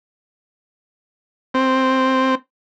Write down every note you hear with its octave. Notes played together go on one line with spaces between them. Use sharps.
C4